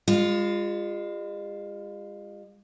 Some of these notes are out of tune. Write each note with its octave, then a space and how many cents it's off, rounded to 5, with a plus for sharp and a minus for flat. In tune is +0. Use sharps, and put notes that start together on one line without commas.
G#3 -40 F4 +0